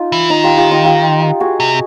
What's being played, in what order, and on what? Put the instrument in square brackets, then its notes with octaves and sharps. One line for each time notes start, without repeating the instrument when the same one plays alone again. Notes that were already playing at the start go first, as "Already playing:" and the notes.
Already playing: [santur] D#4 F4
[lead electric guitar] E3
[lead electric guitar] D#3 [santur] D#4
[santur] F4 G4
F4 G4
D#4 F4
F4 G4
F#4 G#4
[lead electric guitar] C3